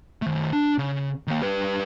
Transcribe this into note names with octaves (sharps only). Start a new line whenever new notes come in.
D#3 A3
D4
C#3
D#3 A#3
G3 B4